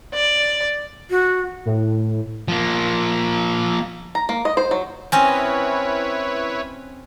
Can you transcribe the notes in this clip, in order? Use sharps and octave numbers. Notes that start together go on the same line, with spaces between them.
D5
F#4
A2
F3 A#3
A#5
A#3
D#5
C5
F#3
C4 C#4 E4 B4 C#5 D#5 G#5